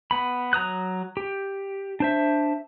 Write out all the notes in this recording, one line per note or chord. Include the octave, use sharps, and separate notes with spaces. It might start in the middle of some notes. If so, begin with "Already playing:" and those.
B3 B5
F#3 A#5 D#6 F#6
G4
D4 C5 E5